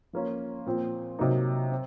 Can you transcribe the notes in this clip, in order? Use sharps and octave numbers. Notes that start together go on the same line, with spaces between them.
F3 A#3 C#4 F4
A#2 F3 C4
C3 F#3 A#3 D#4
C4